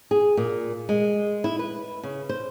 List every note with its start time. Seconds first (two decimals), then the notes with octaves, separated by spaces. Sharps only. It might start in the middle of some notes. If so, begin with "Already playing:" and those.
0.11 G#4
0.37 A#2
0.89 G#3
1.44 E4
1.59 B4
2.03 C#3
2.29 C5